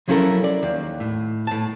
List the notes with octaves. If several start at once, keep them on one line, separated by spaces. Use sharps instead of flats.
F3 F#3 C#4 E4 A4 A#4
D5
D#2
A2
A2 A5